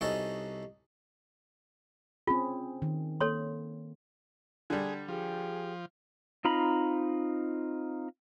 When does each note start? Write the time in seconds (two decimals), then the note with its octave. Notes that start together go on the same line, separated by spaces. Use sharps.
0.01 C2 C#4 D#4 F#4 A4
2.27 C4 C#4 F4 G#4
2.82 D#3
3.21 A#3 A4 C#5 C6
4.70 D3 G3 G#4
5.08 F3 G4 G#4 G5
6.45 C4 D#4 F4 A#5 B5